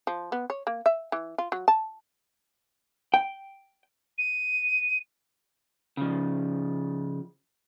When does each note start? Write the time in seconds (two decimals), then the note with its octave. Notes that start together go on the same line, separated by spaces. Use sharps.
0.07 F3
0.32 B3
0.50 C#5
0.67 A#3
0.86 E5
1.12 E3
1.38 F4
1.52 F#3
1.68 A5
3.14 G5
4.18 D#7
5.97 C#3 F3